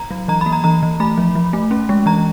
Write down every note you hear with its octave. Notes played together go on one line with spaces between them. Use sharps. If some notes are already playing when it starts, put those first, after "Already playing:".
Already playing: A#5
F#3
E3 A#5
A#3 B5
A#5
E3 A#5
E3
A3 B5
F3
F3
A3
C#4
G#3
E3 A#5